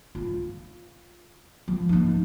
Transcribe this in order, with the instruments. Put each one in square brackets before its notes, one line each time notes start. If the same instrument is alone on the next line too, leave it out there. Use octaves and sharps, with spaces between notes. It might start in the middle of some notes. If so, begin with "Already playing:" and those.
[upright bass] F4
F3
A#3 D#4